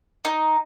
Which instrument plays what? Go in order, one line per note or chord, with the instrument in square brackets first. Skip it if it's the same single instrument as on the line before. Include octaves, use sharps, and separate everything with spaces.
[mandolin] D#4